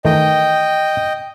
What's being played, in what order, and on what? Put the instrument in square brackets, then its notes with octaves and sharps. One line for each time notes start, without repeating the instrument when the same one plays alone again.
[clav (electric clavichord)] D#3 E3 A3 [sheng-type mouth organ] D#5 G5